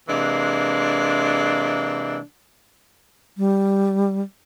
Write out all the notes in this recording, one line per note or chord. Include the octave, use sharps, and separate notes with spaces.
C3 E3 G#3 A#3 D4
G3